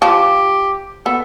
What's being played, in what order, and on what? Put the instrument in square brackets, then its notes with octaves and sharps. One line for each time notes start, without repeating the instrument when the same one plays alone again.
[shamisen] F3 [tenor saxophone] G4
[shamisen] B3 [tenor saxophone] A4